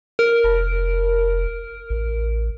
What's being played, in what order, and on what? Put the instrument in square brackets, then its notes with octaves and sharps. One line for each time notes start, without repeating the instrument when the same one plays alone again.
[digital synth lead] A#4
[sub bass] F1
A1